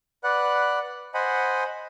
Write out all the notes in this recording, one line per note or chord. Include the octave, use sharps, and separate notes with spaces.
B4 D5 F#5 F#6
C5 D#5 F#5 G#5 B5